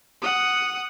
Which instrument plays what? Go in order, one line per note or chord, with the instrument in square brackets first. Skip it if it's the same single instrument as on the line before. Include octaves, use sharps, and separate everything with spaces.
[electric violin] F#5 D#6